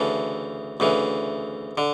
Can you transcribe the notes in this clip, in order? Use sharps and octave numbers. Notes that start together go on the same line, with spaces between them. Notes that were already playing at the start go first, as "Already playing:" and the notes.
Already playing: D2 C#3 E3 A4
D2 C#3 E3
D3